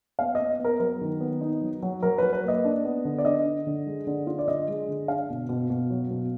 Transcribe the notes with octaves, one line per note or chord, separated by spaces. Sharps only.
B3 F5
D#5
B3
B3
A#4
F#3 A#4
D#3
B3
D#4
F#3
F#3
F#3 A#4
F#3 B4
B4
A#3 D#5
D4
B3
D3
D5
D4 D#5
D4
D3
G#3
D3
F4
D5
D4 D#5
G#3
D3
D4 F5
B2
B2
B2
F#3
B2